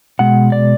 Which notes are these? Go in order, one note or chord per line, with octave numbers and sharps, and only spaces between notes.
B2 G#3 F#5
D5